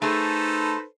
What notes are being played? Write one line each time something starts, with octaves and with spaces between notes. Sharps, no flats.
A3 D#4 G#4 A4 B4 C5